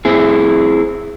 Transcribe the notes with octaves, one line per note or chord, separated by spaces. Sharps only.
C4 E4 G#4